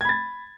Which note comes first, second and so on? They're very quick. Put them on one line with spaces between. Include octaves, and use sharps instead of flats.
G#6 B5 A6